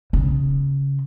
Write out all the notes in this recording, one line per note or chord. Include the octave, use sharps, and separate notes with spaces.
C#3